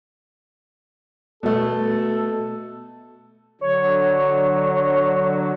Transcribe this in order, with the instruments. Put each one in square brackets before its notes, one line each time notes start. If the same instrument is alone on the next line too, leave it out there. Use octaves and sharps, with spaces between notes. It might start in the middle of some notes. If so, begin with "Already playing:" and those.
[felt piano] B2 A3 [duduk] A4
[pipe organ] D3 F#3 [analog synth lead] C#5